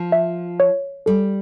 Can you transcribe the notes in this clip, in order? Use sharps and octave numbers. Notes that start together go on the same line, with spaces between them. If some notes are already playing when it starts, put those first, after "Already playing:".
Already playing: F3
E5
C#5
G3 A4